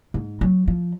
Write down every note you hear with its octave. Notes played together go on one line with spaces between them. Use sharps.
G#2
F#3
F3